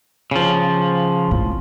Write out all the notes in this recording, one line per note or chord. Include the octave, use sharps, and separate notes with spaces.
C#3 F3
G#1 A2